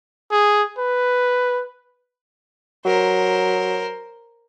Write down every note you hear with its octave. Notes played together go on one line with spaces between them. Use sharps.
G#4
B4
F#3 A#4 C5